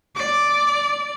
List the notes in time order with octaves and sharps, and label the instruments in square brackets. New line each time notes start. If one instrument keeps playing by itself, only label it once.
[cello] D5 [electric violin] D6